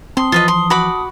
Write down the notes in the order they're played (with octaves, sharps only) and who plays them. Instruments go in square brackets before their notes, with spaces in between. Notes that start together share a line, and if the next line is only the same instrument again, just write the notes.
[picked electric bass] C4 [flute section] A5 D#6 [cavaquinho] C6
[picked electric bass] E3 F3 [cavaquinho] F4 B4 D#5
[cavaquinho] C6
F#4 B5 D6